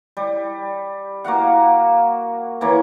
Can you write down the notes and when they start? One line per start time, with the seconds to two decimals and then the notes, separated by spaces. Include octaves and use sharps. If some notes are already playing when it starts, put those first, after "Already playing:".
0.17 G3
1.24 A#3 F#4 F5 F#5
2.61 E3 A#3 C#5